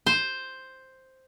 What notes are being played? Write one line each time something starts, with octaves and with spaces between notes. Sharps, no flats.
C5